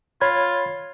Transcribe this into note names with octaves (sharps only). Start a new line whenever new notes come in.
F4 C#5 B5 G#6